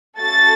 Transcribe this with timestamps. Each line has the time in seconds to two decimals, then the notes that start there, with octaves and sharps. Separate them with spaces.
0.19 A3 C#4 F#4 A4 A6